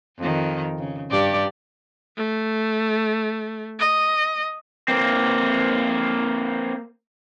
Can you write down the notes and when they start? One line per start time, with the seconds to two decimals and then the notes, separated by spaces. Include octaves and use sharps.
0.18 F2 D#3
0.79 C#3
1.11 G2 G4 D5
2.17 A3
3.79 D#5
4.88 A#3 C4